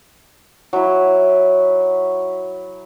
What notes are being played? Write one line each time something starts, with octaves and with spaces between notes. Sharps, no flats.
F#3 E4